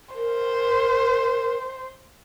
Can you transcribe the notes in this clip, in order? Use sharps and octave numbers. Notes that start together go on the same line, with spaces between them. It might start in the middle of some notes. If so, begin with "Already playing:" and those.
A#4 C5